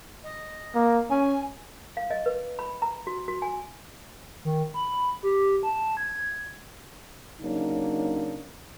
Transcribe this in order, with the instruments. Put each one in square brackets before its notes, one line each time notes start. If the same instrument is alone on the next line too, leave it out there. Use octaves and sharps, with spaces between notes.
[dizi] D#5
[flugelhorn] A#3
[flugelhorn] C#4 [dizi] G#5
[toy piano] F5
D#5
B4
B5
A#5
F#4
F#4
G#5
[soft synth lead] D#3
B5
G4
A5
G#6
[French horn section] C#3 F#3 A#3 D4 D#4